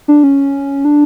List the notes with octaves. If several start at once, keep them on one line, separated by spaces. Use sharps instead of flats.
D4
C#4
D4